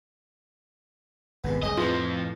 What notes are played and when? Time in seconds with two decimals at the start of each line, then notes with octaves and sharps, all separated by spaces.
1.44 G#1 D#2 C3 G#3 B3
1.63 F#1 C#2 C#4 G#4 D#5
1.77 F2 A2 E3 F3 D#4 F4 A4